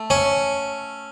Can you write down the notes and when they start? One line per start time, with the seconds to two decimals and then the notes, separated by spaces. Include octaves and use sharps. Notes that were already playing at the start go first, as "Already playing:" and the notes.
Already playing: A3
0.10 C#4